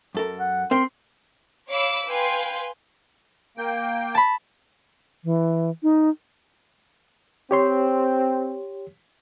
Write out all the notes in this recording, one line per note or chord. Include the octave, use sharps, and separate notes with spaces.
F#2 A4 A#4
F#5
C4 A#4 C6
C#5 F5 B5 D6 E6
B4 F5 G5 G#5 C6
A#3 G5
A5 B5
E3
D#4
C4 G4 C#5 C6